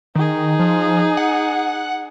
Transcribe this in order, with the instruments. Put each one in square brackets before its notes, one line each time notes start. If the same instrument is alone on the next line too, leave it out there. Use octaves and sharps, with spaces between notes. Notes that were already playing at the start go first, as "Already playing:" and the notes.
[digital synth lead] D#3 [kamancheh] D#4 G#4
[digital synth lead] F3
F#5